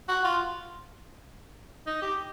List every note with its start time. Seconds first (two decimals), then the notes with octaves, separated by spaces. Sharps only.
0.08 F#4
0.24 F4
1.87 D#4
2.02 G4